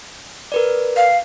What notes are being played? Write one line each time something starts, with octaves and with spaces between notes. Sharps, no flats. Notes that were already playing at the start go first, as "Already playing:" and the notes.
A#4 B4 D5
F5